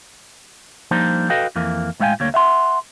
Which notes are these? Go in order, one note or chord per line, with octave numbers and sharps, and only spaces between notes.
F3 G3 A#3 D4 D#4 C5
F#4 A4 B4 D#5 F5 G5
F2 E3 A#3
A2 G#3 B3 F5 G5 G#5
D2 G3 A#3 C#5
E5 F#5 C6